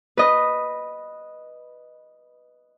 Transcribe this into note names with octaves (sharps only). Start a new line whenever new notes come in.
B4 D#5